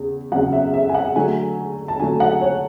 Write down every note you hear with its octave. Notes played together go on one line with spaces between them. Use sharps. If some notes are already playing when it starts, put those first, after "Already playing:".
Already playing: E2 C#3
E2 C#3 F#3 F#5
E5
E5
G#5
F#5
D3 F#3 A3 G#5
A5
D3 F#3 A3 G#5
F#5
C#5